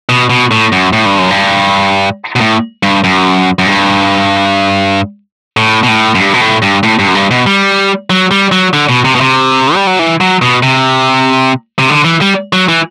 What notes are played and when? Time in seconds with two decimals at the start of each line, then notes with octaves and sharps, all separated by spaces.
0.09 B2
0.30 B2
0.51 A2
0.72 F#2
0.93 A2
1.06 G2
1.18 F#2
1.31 G2
2.36 B2
2.41 A2
2.83 G2
3.04 F#2
3.59 F#2
3.67 G2
5.57 A2
5.83 B2
5.88 A2
6.15 F#2
6.20 G2
6.34 B2
6.41 A2
6.62 G2
6.83 A2
6.99 G2
7.08 F#2
7.15 G2
7.31 B2
7.47 G3
8.10 F#3
8.31 G3
8.52 F#3
8.73 D3
8.89 B2
9.05 C3
9.15 B2
9.21 C3
9.75 G3
9.87 F#3
9.99 E3
10.21 F#3
10.42 B2
10.63 C3
11.79 C3
11.90 D3
12.04 E3
12.21 G3
12.53 F#3
12.69 E3